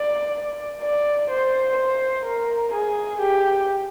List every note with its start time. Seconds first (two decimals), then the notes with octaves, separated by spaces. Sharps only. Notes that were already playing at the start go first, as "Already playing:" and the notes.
Already playing: D5
0.82 D5
1.30 C5
1.77 C5
2.26 A#4
2.74 G#4
3.21 G4